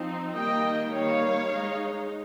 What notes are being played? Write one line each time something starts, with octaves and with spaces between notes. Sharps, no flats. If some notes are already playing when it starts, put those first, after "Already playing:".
Already playing: F3 C4 D#4
D#3 G3 A#3 D#5 G5
D#3 G3 A#3 C#5 F5
G#3 D#4